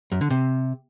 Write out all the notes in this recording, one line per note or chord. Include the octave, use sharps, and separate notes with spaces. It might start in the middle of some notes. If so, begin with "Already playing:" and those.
F#2
D3
C3